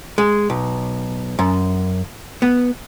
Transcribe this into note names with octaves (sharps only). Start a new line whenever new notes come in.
G#3
B1
F#2
B3